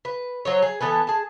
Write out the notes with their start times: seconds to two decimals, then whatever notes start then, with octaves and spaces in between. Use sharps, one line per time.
0.05 B4
0.45 F#3 C5 C#5
0.63 G#4
0.81 E3 B3 A4 B4
1.07 G#4 A5